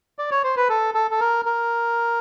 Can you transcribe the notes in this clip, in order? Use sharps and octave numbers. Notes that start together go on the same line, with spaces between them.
D5
C#5
C5
B4
A4
A4
A4
A#4
A#4